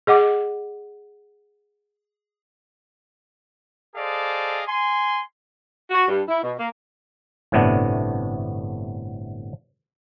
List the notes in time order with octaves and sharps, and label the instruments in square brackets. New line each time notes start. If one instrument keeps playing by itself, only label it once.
[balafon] G#4 D#5 F#5 D6
[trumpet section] G#4 A4 C5 D5 D#5 F5
G#5 C6
[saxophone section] F#4
G2
E4
B2
A#3
[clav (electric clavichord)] G1 A2 C3 A3 B3 D4